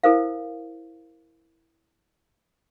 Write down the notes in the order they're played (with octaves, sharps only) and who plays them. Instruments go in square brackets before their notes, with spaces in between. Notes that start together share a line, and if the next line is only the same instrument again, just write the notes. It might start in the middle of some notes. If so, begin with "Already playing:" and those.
[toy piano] E4 A4 A#4 C5 F5